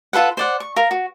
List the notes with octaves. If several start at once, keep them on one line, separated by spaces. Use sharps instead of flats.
F4 A4 B4 F#5
C5 D5 F#5
C#6
A#4 F5
F#4